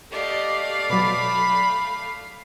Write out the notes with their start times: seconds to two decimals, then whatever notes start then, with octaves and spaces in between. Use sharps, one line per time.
0.11 A3 G4 D5 D#5 F5
0.90 B2 F#3 B5